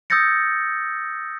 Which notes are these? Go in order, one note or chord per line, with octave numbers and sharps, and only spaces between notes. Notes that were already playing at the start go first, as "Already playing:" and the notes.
D#6 E6 G6 A6 A#6 C#7